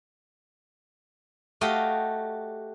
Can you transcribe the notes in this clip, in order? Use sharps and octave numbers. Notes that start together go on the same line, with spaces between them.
A3 F#4 G4 D#5 F5 G5